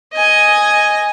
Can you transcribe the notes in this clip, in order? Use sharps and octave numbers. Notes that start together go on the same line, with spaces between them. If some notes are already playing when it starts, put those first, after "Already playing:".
D#5 G#5